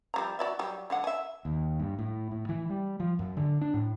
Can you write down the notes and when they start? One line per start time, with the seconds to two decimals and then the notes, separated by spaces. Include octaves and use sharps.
0.14 F3 G3 A#5
0.39 F#4 D5 E5
0.59 F#3 G3 G4
0.90 D3 G#3 F#5
1.04 E5 G#5
1.45 D#2
1.80 G2
1.99 A2
2.31 A2
2.49 E3
2.70 G3
3.00 F3
3.19 F#2
3.37 D3
3.61 D4
3.74 A2